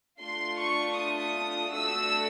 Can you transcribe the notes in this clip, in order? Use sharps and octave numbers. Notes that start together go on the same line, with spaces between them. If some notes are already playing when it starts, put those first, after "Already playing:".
A3 D4 F4 C6
C#6
D#6
A3 D4 F#4 A4 E6